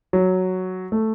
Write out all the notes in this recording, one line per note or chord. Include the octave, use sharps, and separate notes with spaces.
F#3
A3